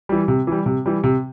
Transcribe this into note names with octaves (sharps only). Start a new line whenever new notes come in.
E3 G3
C3
E3 G3
C3
E3 G3
C3